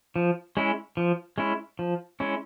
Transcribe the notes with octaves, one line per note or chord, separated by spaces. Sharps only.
F3
G#3 C#4 E4
F3
G#3 C#4 E4
F3
G#3 C#4 E4